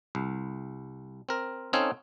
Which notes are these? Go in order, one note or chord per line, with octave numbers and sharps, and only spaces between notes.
C2
C4 A#4
C4 C#4 D#4 A4 C#5 F5